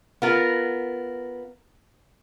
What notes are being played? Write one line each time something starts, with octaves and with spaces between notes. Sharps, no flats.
B3 F4 A#4